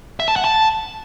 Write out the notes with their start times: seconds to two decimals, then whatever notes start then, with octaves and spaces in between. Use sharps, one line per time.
0.20 E5
0.28 A5
0.36 F#5
0.44 A5